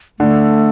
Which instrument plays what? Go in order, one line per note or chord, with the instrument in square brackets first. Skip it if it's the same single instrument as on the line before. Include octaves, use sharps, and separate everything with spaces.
[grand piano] D3 [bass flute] A3